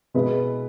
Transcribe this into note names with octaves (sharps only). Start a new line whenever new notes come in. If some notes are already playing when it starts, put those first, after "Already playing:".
B2 G#3 B3 E4 B4